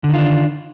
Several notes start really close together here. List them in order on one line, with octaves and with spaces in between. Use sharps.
D3 D#3 F4 D4